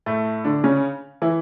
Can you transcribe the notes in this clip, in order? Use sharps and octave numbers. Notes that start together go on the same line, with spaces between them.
A2 A3
D3 D4
C#3 C#4
E3 E4